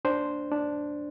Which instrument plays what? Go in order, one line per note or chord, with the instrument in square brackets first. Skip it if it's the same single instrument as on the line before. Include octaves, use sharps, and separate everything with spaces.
[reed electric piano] D4 C5
D4